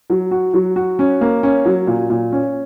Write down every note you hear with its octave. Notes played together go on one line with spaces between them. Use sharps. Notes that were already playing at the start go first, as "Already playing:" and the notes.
F#3
F#4
F#3
F#4
C#4
A#3
C#4
F#3
A#2
A#2
C#4